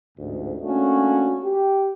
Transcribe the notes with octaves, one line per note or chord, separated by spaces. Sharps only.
A1 D2 G#2
A3 A#3 C#4 D4 F#4
G4